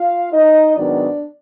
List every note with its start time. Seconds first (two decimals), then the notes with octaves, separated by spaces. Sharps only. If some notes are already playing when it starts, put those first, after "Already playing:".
Already playing: F4 F5
0.33 D#4 D#5
0.76 G#2 D#3 F#3 B3 D4 D5